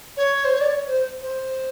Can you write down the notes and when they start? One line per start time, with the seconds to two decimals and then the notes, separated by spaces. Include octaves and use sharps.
0.17 C#5
0.44 C5
0.51 C#5
0.60 D5
0.69 C#5
0.87 C5
1.21 C5